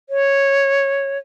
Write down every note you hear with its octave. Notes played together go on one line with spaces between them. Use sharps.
C#5